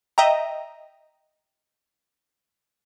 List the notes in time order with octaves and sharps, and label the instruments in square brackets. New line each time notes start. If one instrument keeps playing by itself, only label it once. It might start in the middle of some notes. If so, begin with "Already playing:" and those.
[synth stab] D#5 E5 G5 A#5